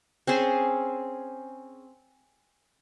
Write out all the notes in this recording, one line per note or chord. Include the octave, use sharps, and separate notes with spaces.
C4 C#4 G#4 C5